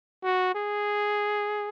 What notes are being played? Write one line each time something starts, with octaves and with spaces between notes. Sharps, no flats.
F#4
G#4